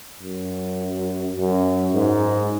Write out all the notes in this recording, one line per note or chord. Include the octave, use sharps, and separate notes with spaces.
F#2
F#2
G#2